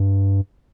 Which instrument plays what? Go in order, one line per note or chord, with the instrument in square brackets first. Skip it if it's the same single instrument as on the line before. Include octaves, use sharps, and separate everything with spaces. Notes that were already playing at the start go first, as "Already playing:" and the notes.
Already playing: [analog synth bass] G2